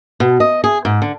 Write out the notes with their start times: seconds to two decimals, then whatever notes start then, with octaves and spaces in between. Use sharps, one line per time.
0.20 B2
0.40 D#5
0.64 G#4
0.85 G#2
1.02 D3